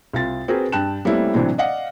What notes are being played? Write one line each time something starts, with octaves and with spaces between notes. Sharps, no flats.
C2 F4 A6
C4 F#4 G#4 A#4 B4
G2 G5 A5 F#6 E7
G3 A3 A#3 C4 C#4 E4
A2 C3 E3 F#3 C4 D4
D5 D#5 F5 F#5